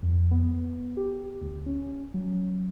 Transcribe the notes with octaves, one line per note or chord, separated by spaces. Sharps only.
F2
B3
G4
D2
C#4
F#3